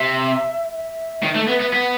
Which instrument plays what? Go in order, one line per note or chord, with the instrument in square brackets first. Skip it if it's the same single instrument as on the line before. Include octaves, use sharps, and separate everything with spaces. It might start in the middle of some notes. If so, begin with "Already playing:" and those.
Already playing: [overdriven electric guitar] C3 [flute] E5
[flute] E5
[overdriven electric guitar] D#3
A3
B3
B3
[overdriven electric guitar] B3 [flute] F#5